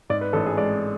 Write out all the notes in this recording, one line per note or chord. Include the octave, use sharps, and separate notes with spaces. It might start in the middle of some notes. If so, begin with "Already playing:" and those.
G#2 D5
B4
A1 A4
G#4
G#3 D5